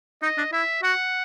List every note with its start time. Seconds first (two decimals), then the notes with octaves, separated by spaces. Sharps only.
0.22 D#4 D#5
0.37 D4
0.52 E4 E5
0.83 F#4 F#5